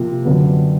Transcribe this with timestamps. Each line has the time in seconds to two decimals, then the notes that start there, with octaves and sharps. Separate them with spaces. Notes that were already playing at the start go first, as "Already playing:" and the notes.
Already playing: C3 F3 A#3
0.25 F#2 D3 F#3 B3